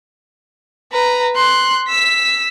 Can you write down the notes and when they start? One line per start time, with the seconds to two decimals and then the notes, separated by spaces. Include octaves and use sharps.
0.92 B4 A#5
1.36 C6 F#6
1.88 E6 B6